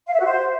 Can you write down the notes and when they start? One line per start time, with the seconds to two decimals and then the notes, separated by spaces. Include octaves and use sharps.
0.07 F5
0.13 E5
0.19 F#4
0.25 C5